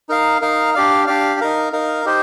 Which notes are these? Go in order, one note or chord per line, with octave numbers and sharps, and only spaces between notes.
D#4 A#4 F5
D#4 A#4 F5
D4 G4 D5 F5
D4 G4 D5 F5
D#4 A#4 F5
D#4 A#4 F5
D#4 G4 C5